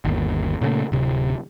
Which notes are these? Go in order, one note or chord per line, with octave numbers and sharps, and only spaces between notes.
G1 D#2
A#2 C#3 G3 A3
D1 C3